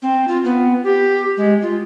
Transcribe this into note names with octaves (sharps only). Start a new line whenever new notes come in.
C4
F4
B3
G4
G#3
F4